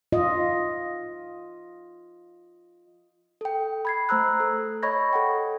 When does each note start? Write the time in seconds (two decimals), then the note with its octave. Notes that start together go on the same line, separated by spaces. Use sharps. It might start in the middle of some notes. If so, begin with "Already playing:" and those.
0.12 F4 D#5
3.41 A4 G5
3.85 B5 G#6 C7
4.09 A3 C5 A#5 E6 F#6
4.40 A4
4.83 C#5 D#5 B5 C#6 G#6 A#6
5.13 A4 F#5 G5